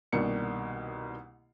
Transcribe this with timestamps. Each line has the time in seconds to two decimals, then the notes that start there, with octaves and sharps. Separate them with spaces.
0.12 C2 B2 D#3 A#3 D4 C#7